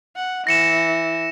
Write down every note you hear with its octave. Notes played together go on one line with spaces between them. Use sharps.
F#5
E3 A#6 C#7 E7